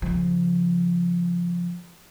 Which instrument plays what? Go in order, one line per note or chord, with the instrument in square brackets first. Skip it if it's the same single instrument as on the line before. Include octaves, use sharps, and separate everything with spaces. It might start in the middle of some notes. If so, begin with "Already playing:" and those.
[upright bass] C#3 F3